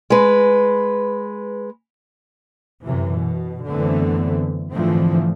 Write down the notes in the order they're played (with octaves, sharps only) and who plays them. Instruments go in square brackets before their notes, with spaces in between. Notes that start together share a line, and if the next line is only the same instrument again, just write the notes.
[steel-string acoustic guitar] G#3 B4
[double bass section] F#2 C3 E3
B2
F#2 D3 E3 A3 B3 C4
G#2 D3 E3 F3 A3 C4